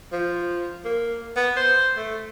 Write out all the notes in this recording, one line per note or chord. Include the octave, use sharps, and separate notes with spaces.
F3
A#3
B3
C5
A3